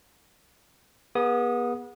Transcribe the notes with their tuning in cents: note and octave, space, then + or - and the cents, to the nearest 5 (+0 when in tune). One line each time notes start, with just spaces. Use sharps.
B3 -35 G#4 -20 D#6 +0